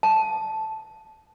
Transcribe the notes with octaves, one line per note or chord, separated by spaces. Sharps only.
A5